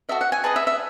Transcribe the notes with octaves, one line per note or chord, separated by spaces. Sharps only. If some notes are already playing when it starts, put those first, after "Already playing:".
F#4 A4 D#5 E5
F#5
G#5
G#4 B4 D#5 A5
E5
E5